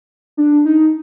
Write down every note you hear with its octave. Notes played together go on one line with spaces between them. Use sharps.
D4
D#4